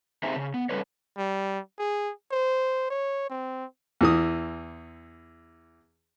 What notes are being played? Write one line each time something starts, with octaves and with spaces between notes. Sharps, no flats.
C4 D#4 G4 G#4 C5 E5
C#3
B3
G3 C#4 A4 B4 C#5
G3
G#4
C5
C#5
C4
E2 E3 D#6